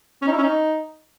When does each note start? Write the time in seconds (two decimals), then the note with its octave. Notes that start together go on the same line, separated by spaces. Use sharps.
0.22 C#4
0.27 D#4
0.32 E4
0.38 C#4
0.43 D#4